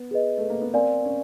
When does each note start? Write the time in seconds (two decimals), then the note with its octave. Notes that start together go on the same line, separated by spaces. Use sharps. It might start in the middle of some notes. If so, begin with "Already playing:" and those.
Already playing: B3
0.11 G#4 B4 D#5
0.37 A3
0.50 A#3
0.62 B3
0.74 C4 A#4 D5 F5 G#5
1.05 C#4